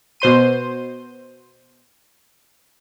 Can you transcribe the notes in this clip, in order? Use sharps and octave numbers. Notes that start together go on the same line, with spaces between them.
B2 C5 C6 D#7